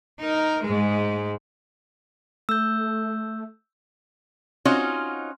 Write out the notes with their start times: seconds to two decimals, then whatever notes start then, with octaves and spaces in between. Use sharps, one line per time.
0.20 D#4 A#4
0.63 G#2 G#3
2.49 A3 E6 G6
4.65 C4 C#4 D#4 F4 F#4 D#5